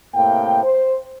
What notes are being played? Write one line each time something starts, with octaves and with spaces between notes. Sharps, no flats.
A2 C3 A#3 F5 G5
C5